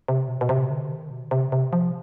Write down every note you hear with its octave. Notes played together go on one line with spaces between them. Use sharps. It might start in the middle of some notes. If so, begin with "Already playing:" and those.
C3
B2
B2
C3
D3
D#3
B2
C3
C3
F3